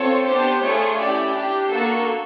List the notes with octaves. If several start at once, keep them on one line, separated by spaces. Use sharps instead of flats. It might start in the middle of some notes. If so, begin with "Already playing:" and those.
Already playing: C4 F4 A4 C#5
B3 D4 G4 C5
A3 D4 F4 G#4 C#5
C#4 E4 G4 D5
D4 G4
A#3 D4 F#4 A4